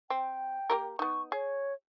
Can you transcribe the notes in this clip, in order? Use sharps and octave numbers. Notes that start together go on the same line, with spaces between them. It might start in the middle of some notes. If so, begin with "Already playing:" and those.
C4 G5
A#3 G4 A#4
B3 D#4 C#6
G#4 C#5